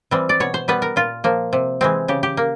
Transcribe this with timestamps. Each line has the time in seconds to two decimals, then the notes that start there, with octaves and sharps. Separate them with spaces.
0.11 E3 G3 C4
0.29 D5
0.40 B2 C#5
0.54 C5
0.68 G3 B3 B4
0.82 A#4
0.96 A#2 F4
1.24 F3 A#3
1.53 C3
1.81 E3 G#3 C4
2.08 C#3 G4
2.23 G4
2.37 A#3